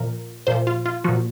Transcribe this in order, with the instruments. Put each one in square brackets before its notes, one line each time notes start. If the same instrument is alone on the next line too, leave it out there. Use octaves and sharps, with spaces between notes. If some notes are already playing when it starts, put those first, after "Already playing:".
Already playing: [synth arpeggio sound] A#2 F3 A#4
A#2 F3 C5
F4
F4
A#2 F3 F#4